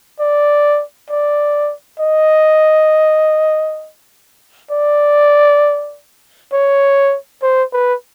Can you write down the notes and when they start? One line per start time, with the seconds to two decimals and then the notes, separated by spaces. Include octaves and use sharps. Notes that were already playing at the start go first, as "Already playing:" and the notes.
0.20 D5
1.10 D5
2.00 D#5
4.72 D5
6.53 C#5
7.42 C5
7.73 B4